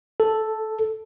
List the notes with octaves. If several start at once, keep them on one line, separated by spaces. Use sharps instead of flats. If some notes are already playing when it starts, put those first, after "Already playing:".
A4